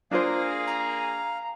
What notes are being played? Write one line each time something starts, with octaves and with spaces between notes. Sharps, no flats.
A#3 D4 F4 G#4 C5 F5
A#5